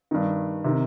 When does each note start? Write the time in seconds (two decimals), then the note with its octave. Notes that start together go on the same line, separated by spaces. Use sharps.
0.11 G2 D#3
0.64 C3 D#3